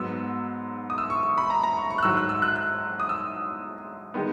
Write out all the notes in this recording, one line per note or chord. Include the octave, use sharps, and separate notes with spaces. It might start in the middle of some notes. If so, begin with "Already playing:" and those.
Already playing: G#2 F#3 B3 E6
D#6
E6
C#6
C#6
B5
A#5
A#5
C#6
C#6
F#6
G#2 D#3 F#3 E6
F#6
E6
F#6
F#6
D#6
E6
D#3 G#3 B3